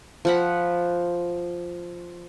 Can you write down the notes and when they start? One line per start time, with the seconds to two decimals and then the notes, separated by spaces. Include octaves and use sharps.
0.25 F3 F#5 B5